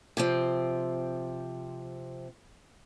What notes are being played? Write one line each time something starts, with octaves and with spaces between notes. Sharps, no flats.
C3 F3 C4